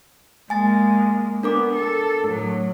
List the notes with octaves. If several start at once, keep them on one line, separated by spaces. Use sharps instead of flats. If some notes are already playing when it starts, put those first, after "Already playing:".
G#3 A#3 G#5 A6
B3 D4 A#4 D6
A4
A2 F#3